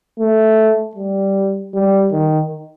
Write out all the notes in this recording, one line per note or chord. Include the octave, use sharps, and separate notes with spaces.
A3
G3
G3
D#3